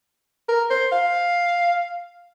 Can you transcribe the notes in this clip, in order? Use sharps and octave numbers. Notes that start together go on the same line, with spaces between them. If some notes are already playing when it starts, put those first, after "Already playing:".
A#4
C5
F5